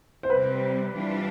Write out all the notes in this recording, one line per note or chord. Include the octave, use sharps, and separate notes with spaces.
C5
C3 G3 C4 B4
E3 G3 D4 F4